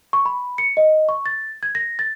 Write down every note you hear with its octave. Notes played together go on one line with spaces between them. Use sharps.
C#6
B5
C#7
D#5
C#6
A6
G#6
A#6
A6